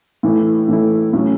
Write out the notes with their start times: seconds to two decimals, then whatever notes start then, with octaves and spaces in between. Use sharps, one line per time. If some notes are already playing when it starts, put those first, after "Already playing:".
0.23 A2 E3 A3 E4
0.68 A2 E3 A3 E4
1.13 A2 F#3 C#4